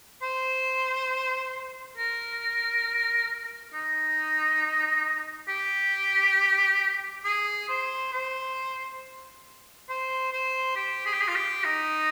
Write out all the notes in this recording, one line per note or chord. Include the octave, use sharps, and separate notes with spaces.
C5
A#4
D#4
G4
G#4
C5
C5
C5
C5
G4
G#4
G4
G#4
F4
G4
D#4